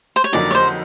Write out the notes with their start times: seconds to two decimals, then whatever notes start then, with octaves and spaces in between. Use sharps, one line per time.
0.16 C5
0.24 C#5
0.32 F2 D3 F#3 A#3 D#4 D5
0.51 C#5
0.55 C5